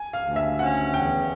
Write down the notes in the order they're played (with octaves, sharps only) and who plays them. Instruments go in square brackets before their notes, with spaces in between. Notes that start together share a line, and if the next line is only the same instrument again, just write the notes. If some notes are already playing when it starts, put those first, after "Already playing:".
Already playing: [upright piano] G#5
F5
[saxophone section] D2
[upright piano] E5
[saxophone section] C#4 [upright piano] F#5
[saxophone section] E2 [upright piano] G5